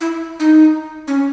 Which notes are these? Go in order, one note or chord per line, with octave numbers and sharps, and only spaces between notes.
E4
D#4
C#4